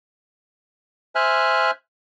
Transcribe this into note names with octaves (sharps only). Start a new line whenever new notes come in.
C5 E5 G#5 F6 F#6